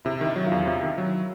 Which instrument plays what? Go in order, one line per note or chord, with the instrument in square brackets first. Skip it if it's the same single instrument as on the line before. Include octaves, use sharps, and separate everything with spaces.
[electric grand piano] C3 [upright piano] E4
[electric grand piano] D#3 [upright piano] E4
[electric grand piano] F#3
[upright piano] F4
[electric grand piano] E2
[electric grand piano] C3 [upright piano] E4
[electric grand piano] D#3
F#3